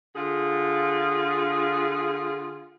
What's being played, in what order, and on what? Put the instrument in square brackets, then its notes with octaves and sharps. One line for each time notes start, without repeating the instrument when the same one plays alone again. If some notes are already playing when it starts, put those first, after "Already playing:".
[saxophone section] D3 F4 G#4